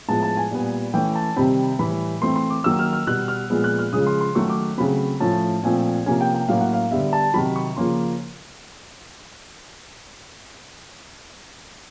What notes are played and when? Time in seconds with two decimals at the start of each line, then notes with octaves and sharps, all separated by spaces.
0.08 A2 F3 G#3 B3 A5
0.23 A5
0.37 G#5
0.51 A#2 G3 B3
0.94 E3 A3 C#4 G5
1.15 A5
1.36 C3 D#3 G3 C4 B5
1.79 A2 E3 G3 B5
2.22 E3 A3 C4 C6
2.36 C6
2.50 D6
2.64 D#3 F#3 A#3 C#4 E6
2.79 F6
2.93 F6
3.07 B2 G3 B3 F#6
3.28 F6
3.50 A#2 F3 G#3 B3
3.64 F#6
3.79 F6
3.93 C#3 F3 G#3 C#4 D#6
4.07 C6
4.21 C6
4.35 D#3 F#3 A3 C#4 C#6
4.50 D6
4.78 C#3 F#3 A3 C4 B5
5.20 A2 F3 A3 C#4 A5
5.63 A#2 F3 A3 C4 G#5
6.06 C3 F3 A#3 C#4 G#5
6.21 G5
6.35 G5
6.49 A2 F#3 A#3 C#4 F5
6.61 F#5
6.73 F5
6.91 D3 G3 B3 E5
7.13 A5
7.34 C3 D#3 F#3 B5
7.56 C#6
7.77 C#3 F3 A#3 C#4 C6